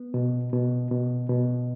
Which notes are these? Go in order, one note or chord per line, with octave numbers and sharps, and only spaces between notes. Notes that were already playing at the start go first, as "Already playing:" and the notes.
Already playing: B3
B2
B2
B2
B2